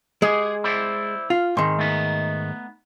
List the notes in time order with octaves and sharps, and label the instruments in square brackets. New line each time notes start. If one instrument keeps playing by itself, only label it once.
[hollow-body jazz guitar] G#3 [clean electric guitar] G4 G#4
[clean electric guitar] E4 C5 D5
[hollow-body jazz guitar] F4 [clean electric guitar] F5
[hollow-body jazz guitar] G#2 D#3 [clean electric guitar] C4 C6
[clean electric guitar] A3 B3 D#4